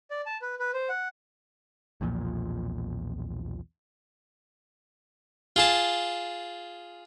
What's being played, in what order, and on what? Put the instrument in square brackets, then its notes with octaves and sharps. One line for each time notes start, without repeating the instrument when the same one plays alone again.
[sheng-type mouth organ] D5
A5
B4
B4
C5
F#5
[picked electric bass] B1 E2 A#2 F3
[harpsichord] F4 G#4 A5